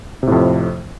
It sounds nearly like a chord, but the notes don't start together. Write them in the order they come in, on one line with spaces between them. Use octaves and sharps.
C3 A2 F2